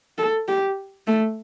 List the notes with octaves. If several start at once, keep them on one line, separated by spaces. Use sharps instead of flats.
A4
G4
A3